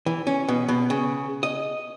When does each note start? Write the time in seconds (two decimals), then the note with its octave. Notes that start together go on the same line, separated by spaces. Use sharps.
0.06 E3
0.27 C#4
0.48 B2
0.69 B2
0.90 C#3
1.43 D#5